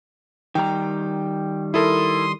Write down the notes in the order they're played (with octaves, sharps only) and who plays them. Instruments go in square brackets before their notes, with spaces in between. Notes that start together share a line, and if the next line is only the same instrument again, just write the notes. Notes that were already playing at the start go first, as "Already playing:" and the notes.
[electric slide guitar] D#3 G3 A#5 [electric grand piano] G5
[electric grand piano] E4 A4 A#4 [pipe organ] C6 D#6